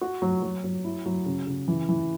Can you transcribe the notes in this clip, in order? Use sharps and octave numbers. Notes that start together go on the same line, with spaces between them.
F#4
F#3
F#3
F#3
E4
F#3
C#3
C#3
E3
E3